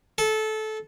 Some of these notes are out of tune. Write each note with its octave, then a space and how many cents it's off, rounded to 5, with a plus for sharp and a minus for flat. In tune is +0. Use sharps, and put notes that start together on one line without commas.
A4 -20